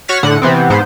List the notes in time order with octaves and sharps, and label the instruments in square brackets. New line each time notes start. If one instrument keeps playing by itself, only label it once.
[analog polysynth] F#4 C#5 F6 A6 B6
A2 D3 F#5
C3 E3 B3 C4
G#2 B3 C5